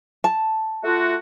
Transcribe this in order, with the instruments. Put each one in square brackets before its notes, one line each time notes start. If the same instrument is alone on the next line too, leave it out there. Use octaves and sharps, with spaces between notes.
[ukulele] A5
[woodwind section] A3 F4 F#4